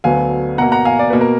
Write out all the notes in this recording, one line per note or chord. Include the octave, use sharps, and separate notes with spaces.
D2 D3 F#3 B3 F5 G#5
B2 A#3 F#5 A#5
F#5 A#5
F5 G#5
D5
B2 A#3 B4
A#4